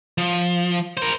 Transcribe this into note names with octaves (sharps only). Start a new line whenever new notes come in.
F3
A#4 C5